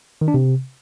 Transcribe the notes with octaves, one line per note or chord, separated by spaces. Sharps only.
D#3
D4
C3